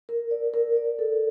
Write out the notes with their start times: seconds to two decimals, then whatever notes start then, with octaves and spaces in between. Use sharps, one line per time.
0.09 A#4
0.31 D5
0.54 A#4
0.77 D5
0.99 A4